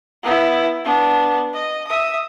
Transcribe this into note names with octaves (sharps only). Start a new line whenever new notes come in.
B3 E4
B3 D4
D#5
E5 D#6